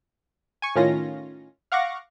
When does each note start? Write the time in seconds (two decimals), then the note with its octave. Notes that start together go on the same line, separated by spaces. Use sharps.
0.62 G#5 C#6
0.76 A2 D#3 C#4 F4 A#6
1.72 F5 F#5 C#6 D6 A#6